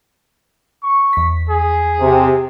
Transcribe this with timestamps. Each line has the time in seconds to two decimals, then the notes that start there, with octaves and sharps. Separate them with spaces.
0.83 C#6
1.13 E2 B6
1.49 G#4
2.01 C3